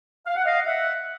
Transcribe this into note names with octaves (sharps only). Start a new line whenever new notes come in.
F5
F#5
D#5 F5
E5 F#5